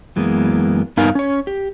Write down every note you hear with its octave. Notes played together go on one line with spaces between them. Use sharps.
F#2 E3 G#3 A#3 B3
G2 B3 D#4 A#4 F5 G#5
C#4 C#5
G4